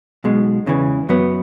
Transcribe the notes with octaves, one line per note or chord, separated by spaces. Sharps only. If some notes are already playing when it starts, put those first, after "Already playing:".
B1 B2 G#3
E2 C#3 E3
F#2 F#3 B3